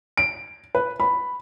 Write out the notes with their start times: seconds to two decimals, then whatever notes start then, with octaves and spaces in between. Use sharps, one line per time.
0.17 D7
0.75 B4
1.00 B5